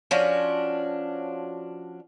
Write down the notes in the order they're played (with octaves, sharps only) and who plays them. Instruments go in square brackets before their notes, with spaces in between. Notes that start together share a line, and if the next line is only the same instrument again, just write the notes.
[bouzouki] F3 C#4 D4 F#4